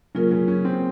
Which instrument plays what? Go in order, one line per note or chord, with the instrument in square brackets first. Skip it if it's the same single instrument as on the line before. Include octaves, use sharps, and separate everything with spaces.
[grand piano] C#3 C#4 [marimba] F#3 A#3 F4 A#4
[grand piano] C#3 C#4
C#3 C#4
C4